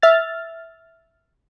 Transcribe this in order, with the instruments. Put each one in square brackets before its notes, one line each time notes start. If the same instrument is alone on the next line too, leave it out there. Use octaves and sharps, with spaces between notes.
[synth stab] E5 F6 A6